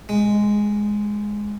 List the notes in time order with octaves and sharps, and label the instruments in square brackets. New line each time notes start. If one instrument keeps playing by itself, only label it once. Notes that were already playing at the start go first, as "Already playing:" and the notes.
[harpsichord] G#3